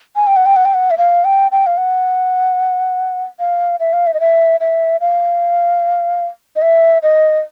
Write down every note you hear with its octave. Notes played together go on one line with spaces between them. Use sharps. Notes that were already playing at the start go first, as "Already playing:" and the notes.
G#5
G5
F#5
G5
F#5
G5
F#5
E5
F5
G5
G5
F5
F#5
F5
E5
F5
E5
D#5
E5
E5
F5
D#5
E5
D#5